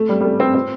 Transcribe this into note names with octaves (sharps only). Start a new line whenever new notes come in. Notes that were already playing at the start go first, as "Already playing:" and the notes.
Already playing: A3
G3
G3
A3
C4
C4